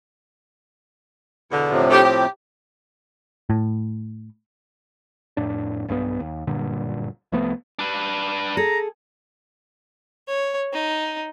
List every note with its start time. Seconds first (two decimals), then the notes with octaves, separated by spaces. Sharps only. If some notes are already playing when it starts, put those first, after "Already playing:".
1.51 E2 B2 D3
1.70 A2 C3 F3
1.90 D3 A3 G4
2.03 G4
3.50 A2
5.37 F2 A2 D4
5.88 B1 G2 F#3 B3
6.20 D#2
6.47 F#1 G2 A#2 D3
7.32 C2 F3 A3 B3
7.79 D4 B4
8.57 G#4 A4 A#5
10.28 C#5
10.73 D#4